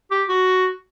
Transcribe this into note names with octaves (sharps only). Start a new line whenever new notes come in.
G4
F#4